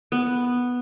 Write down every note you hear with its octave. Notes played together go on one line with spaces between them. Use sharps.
B3